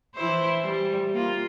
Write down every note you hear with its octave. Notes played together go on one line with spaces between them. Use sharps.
E3 E4 C5
G3
A#3 F4